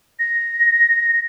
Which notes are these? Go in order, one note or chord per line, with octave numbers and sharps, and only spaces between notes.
A#6